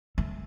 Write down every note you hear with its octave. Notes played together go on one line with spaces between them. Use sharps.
A3